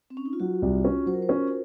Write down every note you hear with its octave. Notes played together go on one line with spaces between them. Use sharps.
C4
C#4
D#4
F4
F#3 F#4
C2
C#4
F#3 C5
A#4
C5
C#4